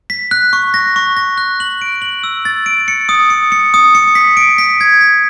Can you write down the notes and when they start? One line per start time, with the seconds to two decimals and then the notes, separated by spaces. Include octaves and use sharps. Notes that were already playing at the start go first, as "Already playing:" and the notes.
0.10 B6
0.31 F#6
0.53 C#6
0.74 A#6
0.96 C#6
1.17 A#6
1.38 F#6
1.60 F#7
1.82 D7
2.02 F#7
2.24 E6
2.45 A6
2.66 D7
2.88 C#7
3.09 D#6
3.30 C#7
3.52 C#7
3.74 D#6
3.95 C#7
4.15 B6
4.37 D7
4.58 B6
4.81 G#6
5.01 B6